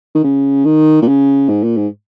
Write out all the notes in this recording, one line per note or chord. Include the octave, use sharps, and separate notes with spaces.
D#3
C#3
D#3
A#2
C#3
G#2
A#2
G#2